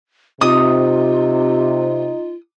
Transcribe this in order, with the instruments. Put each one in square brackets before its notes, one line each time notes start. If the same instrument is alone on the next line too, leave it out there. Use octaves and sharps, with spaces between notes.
[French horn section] C3 [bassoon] D#4 [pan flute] F4 [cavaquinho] D#6